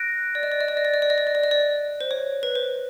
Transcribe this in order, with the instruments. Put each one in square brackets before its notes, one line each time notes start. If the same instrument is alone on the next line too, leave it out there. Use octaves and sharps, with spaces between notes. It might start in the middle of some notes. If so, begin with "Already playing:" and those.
Already playing: [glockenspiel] F#6 A#6 D7
[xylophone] D5
D#5
D5
D#5
D5
D#5
D5
D#5
D5
D#5
D5
D#5
D5
D#5
D5
C5
C#5
B4
C5